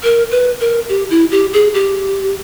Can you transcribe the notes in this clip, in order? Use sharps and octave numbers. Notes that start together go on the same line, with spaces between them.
A#4
B4
A#4
G4
E4
G4
G#4
G4